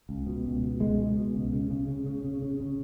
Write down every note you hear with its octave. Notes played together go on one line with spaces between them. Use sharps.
C#2
B2
C#2
B2
C#2 G#3
B2
B2
C#2
C#3
C#3
C#3
C#3
C#3
C#3
C#3